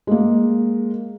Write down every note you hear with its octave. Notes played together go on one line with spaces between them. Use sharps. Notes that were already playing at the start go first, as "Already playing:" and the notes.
G#3 A#3